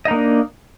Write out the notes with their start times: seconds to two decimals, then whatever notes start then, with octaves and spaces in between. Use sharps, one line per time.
0.05 D#5
0.08 D#4
0.11 A#3
0.14 D4